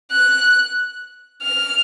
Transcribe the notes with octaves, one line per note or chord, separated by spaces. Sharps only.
F#6
F6